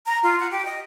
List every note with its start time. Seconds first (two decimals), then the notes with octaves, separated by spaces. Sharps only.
0.06 A#5
0.23 F4
0.38 F#5
0.50 G4
0.65 D#5